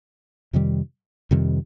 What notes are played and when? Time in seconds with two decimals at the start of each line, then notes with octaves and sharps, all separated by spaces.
0.53 F2 C3 D#3 G3
1.31 F2 C3 D#3 G3